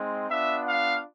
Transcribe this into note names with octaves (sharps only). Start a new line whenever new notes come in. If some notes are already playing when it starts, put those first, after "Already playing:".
Already playing: G#3 C4 D#4
B3 D4 F4 E5
F5